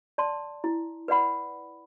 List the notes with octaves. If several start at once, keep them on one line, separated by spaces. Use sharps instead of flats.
D5 A5 C6
E4
B4 D5 F#5 B5